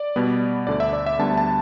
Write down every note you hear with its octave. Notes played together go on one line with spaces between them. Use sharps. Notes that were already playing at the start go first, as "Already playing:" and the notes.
Already playing: D5
B2 G3 B3
D2 D3 A3 D5
E5
D5
E5
D2 D3 G3 B3 A5
A5